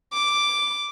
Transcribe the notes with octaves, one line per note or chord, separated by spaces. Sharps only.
D6